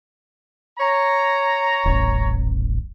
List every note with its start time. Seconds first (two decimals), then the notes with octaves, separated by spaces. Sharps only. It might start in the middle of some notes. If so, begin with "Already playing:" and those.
0.79 C#5 A#5
1.85 D#1 A1